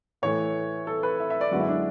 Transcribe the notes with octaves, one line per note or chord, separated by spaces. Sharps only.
A2 E3 A3 C#5
A4
B4
E5
E5
D5
F#2 D3 G#3 B3 F#4
E4
D4